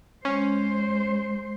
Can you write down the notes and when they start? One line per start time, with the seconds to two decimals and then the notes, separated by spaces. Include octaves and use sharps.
0.25 G#3 C#4 C5